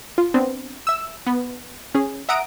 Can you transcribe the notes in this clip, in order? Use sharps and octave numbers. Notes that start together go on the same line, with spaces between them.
F4
B3 C4 D4
E5 E6
B3
C#4 G#4
E5 F#5 A#5 D#6 D7